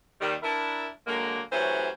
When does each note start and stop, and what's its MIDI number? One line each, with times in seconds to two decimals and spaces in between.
0.21 0.35 39
0.21 0.35 51
0.21 0.35 55
0.43 0.87 62
0.43 0.87 64
0.43 0.87 70
1.07 1.41 50
1.07 1.41 54
1.07 1.41 56
1.07 1.41 58
1.52 1.89 52
1.52 1.89 54
1.52 1.89 57
1.52 1.89 61
1.52 1.89 67
1.52 1.89 72